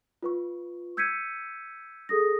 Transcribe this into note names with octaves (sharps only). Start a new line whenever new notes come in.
F4 B4 C#6
E6 G6 G#6 B6 C#7 D#7
G#4 A4 D#6 A#6